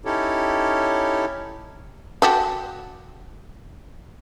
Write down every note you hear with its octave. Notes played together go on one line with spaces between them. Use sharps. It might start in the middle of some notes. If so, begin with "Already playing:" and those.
C#4 D#4 E4 G4 A4 C#5
F#4 G4 A4